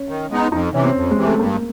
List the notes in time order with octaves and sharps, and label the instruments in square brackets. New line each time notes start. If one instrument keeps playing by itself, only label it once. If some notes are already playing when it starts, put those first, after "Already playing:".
Already playing: [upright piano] C#4
[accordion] D#3
G#3 B3 D#4
[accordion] F2 [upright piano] D#4
[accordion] C3 E3 [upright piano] C#4
[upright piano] C4
[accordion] F2
[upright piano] G#3
[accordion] C3 E3
[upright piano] A3
[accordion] G2 [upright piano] A#3